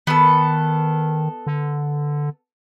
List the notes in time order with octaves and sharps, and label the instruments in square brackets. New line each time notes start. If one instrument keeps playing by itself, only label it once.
[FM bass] D#3 [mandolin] B3 A4
[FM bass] D3